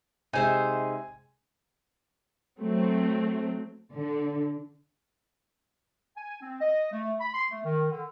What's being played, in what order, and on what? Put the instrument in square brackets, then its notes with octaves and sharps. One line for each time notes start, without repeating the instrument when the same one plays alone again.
[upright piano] C3 G#3 [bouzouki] D#4 C5 E5 [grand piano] G#5
[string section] F#3 A3 C4
D3
[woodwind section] G#5
C4
D#5
A3
B5
C6
A3
D#3
D3